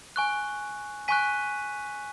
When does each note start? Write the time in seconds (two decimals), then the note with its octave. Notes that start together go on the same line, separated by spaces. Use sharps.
0.16 G#5 C#6 F#6
1.08 G#5 C#6 F#6 B6 D#7